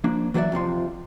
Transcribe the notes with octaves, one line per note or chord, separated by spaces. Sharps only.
F3 A#3 D4
E3 F#3 F#4 C5 D5 E5
F2 C3 F3 C6